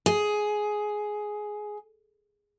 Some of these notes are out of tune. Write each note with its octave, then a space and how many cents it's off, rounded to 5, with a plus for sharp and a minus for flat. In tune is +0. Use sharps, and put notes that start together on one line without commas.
G#4 +10